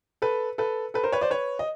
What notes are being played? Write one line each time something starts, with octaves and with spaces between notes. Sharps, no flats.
A4 B4
A4 B4
A4 B4
A#4 C5
B4 C#5
C5 D5
B4 C#5
D#5